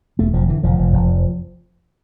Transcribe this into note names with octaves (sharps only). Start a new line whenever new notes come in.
E1 A3
E1 F3
D3 E3
E1 F3
F1
F1